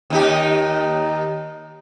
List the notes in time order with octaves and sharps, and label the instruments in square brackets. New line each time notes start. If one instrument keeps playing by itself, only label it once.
[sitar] D#2 D#4 G4